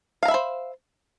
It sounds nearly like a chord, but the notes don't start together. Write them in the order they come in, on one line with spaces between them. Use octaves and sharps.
F5 A#5 E5 B5 C5